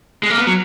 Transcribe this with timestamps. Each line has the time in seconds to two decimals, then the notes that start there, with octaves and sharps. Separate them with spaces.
0.23 G#3
0.30 A#3
0.38 B3
0.47 F#3